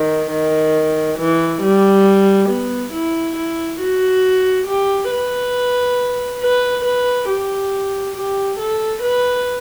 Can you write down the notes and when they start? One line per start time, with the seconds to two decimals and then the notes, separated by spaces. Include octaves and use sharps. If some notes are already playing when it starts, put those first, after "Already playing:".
Already playing: D#3
0.32 D#3
1.19 E3
1.62 G3
2.49 B3
2.93 E4
3.36 E4
3.80 F#4
4.67 G4
5.10 B4
6.41 B4
6.85 B4
7.28 G4
8.15 G4
8.59 A4
9.03 B4